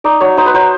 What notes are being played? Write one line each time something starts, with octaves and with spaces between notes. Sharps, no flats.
D#4 D5
F#3 C#5
D#4 C5
B4
F#3 C5